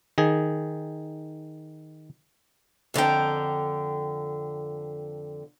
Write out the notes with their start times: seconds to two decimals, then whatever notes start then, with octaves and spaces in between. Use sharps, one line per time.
0.18 D#3 G#4
2.94 F2 D3 A#4 G5